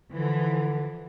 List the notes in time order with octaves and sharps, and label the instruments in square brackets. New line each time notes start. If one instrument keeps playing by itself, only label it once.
[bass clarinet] D3 [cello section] E3 F3